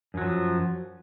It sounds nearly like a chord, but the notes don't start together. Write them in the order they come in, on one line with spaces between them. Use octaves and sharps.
F#2 F#3 F3